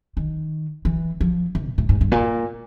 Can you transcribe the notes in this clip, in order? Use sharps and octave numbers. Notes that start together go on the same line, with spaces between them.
D#3
E3
F3
E3
A#2
A2
G#2
G2
A#2